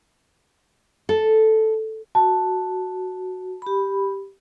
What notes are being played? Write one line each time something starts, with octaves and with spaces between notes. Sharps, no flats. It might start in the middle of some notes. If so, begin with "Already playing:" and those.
A4
F#4 A5
G4 B5